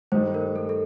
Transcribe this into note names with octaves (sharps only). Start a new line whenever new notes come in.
G2 D#3 A3 D#4 A4 C5
A#4
A4
A4